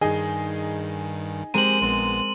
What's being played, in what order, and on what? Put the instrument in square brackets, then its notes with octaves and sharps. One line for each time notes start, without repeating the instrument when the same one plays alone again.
[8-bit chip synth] G2 D#3 [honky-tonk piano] D#4 G#4
[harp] G#3 A#4 A#5 [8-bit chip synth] C4 G4 C5 [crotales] D#7 F#7
[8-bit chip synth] A#1 B3 [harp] C4